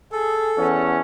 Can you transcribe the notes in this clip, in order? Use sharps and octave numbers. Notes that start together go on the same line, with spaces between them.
G#4 A4
E2 C#4 F#5 A5